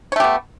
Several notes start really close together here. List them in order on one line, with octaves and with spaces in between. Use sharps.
C#5 A3 G4 B3